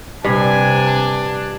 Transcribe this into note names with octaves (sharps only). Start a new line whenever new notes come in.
G2 C3 D4 G#5